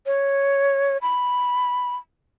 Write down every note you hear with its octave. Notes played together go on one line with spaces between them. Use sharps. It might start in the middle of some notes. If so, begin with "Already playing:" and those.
C#5
B5